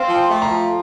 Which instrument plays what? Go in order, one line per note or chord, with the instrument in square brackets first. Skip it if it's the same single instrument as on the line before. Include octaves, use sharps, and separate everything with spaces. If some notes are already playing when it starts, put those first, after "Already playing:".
Already playing: [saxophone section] C4 [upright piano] F5
[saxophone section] F3
[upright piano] G5
[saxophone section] A3
[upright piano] A#5
[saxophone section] F3